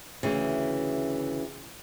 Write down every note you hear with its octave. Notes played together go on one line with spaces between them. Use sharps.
D2 C#3 E3